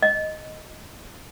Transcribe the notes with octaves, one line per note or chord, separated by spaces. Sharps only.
D#5